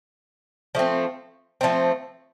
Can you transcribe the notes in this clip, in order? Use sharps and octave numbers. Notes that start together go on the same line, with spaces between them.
F3 A3 C4
F3 A3 C4